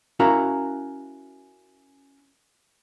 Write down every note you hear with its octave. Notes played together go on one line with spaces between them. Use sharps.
C#4 E4 F#4 A#4 F5 A#5